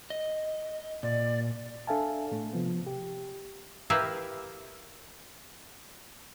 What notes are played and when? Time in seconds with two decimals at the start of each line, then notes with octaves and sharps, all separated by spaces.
0.10 D#5
1.03 A#2 D5
1.87 D4 A4 E5 F5 G#5 A5
2.31 A2 A3
2.53 C3 F3 B3
2.87 G4
3.90 E4 G4 A#4 B4 E5 F5